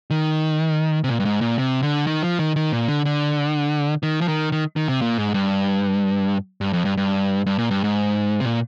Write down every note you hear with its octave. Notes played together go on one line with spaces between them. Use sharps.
D#3
C3
A#2
G2
G#2
A#2
C3
D3
D#3
F3
D#3
D#3
A#2
D3
D3
D#3
F3
D#3
D#3
D#3
C3
A#2
G#2
G2
G2
F2
G2
G2
G2
A#2
G2
G#2
C3
A#2